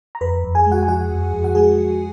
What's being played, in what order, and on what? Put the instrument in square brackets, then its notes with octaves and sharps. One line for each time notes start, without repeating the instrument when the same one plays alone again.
[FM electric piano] A#5
F2 B4 B5
F2
G#4 G#5
G#3
F#4 F#5
G#5
F3 F#4 F#5
F2
F2
F#5
G#3 G#4 G#5
F3